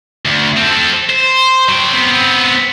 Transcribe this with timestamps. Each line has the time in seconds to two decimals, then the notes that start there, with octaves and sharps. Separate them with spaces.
0.25 D2
0.57 C4 A4
1.10 C5
1.69 F#3 G5
1.92 B3 C4